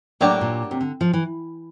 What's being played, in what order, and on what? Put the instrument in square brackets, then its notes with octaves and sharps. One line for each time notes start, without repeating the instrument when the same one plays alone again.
[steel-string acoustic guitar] A2 [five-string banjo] F#3 A#3 D4 G4
[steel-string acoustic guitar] A#2
C3
D3
F3
E3